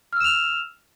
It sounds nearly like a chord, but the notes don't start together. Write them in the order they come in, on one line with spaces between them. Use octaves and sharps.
F6 E6 E7 F7